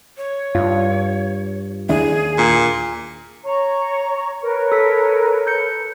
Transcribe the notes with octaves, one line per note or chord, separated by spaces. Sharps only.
C#5
G2 F4
D#2 D4 E4 G#4
A#2
C#5 A#5 C#6
A#4 B4 C#5
A4 B6
A4 G6 C#7